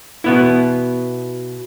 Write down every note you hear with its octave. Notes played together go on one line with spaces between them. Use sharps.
B2 B3 E4